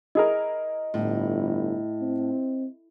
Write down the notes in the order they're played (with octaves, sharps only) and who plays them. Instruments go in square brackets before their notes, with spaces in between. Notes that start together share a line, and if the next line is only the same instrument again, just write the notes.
[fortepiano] E4 G#4 A#4 [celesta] D#5
[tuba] G1 [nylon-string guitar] A2
[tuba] C4